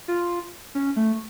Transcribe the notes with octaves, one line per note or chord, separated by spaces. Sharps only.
F4
C#4
A3